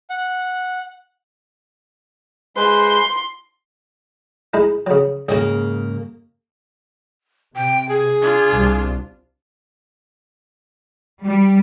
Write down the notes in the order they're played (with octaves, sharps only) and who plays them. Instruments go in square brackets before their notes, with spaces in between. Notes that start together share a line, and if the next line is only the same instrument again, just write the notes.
[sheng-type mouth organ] F#5
[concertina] G#3 B4 C5 [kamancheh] C6
[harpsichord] G#3 D#4 E4
C#3 F#3
[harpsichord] B1 [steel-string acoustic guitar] G#2 C#3 A#3
[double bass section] C3 [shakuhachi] G5
[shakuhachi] G#4
[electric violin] D4 F4
[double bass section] C2
[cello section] G3